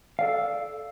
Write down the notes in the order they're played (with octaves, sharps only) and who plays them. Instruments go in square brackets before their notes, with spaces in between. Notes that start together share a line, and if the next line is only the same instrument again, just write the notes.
[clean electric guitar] A4 D5 F5